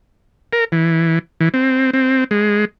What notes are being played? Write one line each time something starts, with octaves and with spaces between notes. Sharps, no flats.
A#4
E3
E3
C4
C4
G#3